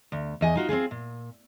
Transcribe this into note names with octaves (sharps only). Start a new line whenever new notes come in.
D2
E2 D#5 G#5
D#4 F4 F#4
C4 C#4 F4 G#4
A#2